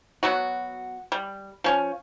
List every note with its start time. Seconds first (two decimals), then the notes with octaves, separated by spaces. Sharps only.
0.23 F#3 B3 F#4
1.12 G3
1.64 F3 C#4